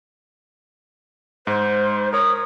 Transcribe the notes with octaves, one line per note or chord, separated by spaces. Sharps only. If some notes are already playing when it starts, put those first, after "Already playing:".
G#2 C5
A#4 C#5 D#6